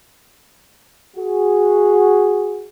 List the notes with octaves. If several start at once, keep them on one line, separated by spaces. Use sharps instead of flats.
F#4 G#4